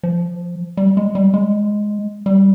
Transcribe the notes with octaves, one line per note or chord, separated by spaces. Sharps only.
F3
G3
G#3
G3
G#3
G3